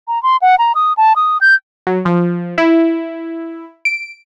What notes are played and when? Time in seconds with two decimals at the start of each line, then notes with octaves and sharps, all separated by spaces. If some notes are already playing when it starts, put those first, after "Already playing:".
0.08 A#5
0.23 C6
0.42 F#5
0.59 A#5
0.75 D#6
0.97 A5
1.16 D#6
1.41 G6
1.87 F#3
2.05 F3
2.58 E4
3.85 D7